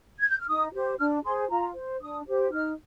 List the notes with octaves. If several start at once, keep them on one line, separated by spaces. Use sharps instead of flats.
G#6
G6
F6
D#4 D#6
G4 C5
D4 F6
G#4 C5 C6
F4 A#5
C5
D4 D#6
G4 C5
D#4 F6